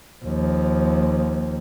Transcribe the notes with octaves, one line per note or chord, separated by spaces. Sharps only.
D#2 F3